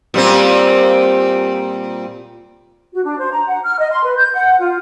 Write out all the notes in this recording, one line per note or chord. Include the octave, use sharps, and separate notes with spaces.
A#2 G3 C4
F#4
D4
C5
A#5
F#5
F6
D#5
C6
B4
G6
F#5
F4